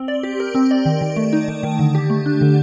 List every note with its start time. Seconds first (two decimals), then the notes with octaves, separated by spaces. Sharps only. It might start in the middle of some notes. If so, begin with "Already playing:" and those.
Already playing: C4
0.08 D5
0.23 G4
0.40 A#4
0.55 C4
0.71 D5
0.85 D#3
1.01 D#3
1.16 A3
1.33 D#4
1.48 D#3
1.63 D#3
1.79 D3
1.95 G4
2.10 A3
2.26 D4
2.41 D3